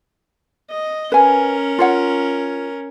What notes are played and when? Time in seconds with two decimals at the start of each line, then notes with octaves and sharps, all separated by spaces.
0.70 D#5
1.12 C#4 A#4 B4 G#5
1.79 F4 C#5 F#5